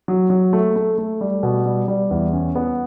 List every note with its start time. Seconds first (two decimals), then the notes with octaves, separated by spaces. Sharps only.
0.08 F#3
0.30 F#3
0.53 A3
0.76 A3
0.98 A3
1.21 G3
1.43 B2
1.65 G3
1.88 G3
2.11 E2
2.33 C#4
2.56 B3